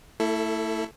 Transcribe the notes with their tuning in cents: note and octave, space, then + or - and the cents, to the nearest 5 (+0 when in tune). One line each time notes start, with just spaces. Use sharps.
A3 +40 E4 +0 A4 +0